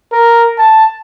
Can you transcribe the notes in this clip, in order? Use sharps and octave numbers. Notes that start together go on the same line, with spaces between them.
A#4
A5